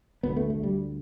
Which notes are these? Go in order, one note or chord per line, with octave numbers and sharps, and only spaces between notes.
D2 D3 B3
A3
A3
G3